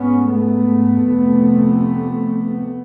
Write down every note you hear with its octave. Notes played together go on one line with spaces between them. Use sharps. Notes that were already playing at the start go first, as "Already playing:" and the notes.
Already playing: G#2 B3 C#4
A3 B3
F2 C3